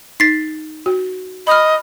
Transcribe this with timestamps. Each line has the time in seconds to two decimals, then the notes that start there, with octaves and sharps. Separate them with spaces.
0.20 D#4 A6 B6 C7
0.86 F#4
1.47 D#5 B5 F6